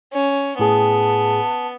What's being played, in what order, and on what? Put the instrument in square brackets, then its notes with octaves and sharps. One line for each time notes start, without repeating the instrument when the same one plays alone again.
[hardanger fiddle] C#4
[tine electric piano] A2 G#4 [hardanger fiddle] B3 [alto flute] A5